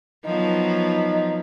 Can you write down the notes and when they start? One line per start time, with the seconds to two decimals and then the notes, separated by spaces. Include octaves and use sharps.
0.25 F3 F#3 B3 D#4